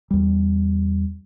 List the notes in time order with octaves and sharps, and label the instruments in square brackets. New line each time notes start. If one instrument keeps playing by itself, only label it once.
[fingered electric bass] E2 G3